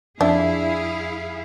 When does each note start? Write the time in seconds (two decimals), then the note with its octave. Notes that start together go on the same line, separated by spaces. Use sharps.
0.21 F2 D4 E4 G#4 E5 F5